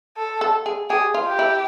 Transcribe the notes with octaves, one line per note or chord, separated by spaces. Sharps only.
A4
A4
G#4
G4 G#4
F4
G4
E4